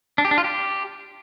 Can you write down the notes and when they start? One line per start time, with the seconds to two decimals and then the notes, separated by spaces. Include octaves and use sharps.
0.18 D4
0.25 G4
0.31 D4
0.38 F4
0.44 G4